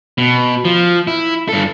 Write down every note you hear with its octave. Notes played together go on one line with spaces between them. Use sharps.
B2
F3
E4
G2 A4